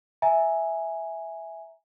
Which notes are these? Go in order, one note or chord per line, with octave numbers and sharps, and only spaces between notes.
E5 G#5 A#5